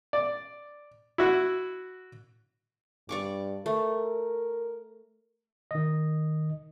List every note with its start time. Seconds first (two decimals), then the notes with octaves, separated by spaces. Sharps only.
0.13 D5
1.18 E4 F#4
3.09 G2 D5 C#6 D6
3.66 A3 A#4
5.71 D#3 D#5